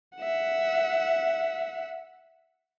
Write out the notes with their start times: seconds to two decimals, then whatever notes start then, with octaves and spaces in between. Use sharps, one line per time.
0.18 E5 F#5